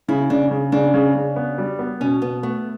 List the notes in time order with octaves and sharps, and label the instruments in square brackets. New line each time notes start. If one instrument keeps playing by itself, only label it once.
[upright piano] C#3 [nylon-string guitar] E4
[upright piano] C#3 [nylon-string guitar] D4
[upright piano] C#3
[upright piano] C#3 [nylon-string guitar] D4
[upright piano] C#3
C#3
B3
G3
B3
[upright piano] B2 [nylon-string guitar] C#4
[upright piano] B2 [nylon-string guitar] B3
[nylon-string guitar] A3 [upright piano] B3